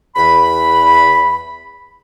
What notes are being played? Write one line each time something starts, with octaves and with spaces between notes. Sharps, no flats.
E2 B5